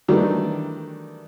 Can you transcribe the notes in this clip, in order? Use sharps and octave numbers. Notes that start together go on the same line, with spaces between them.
D#3 E3 F#3 G3 A3 D4